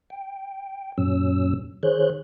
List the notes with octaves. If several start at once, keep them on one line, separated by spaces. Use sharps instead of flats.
G5
F#2 A#2 F#3 C#4 E6
D#3 G#4 C5 C#5 F#6 G6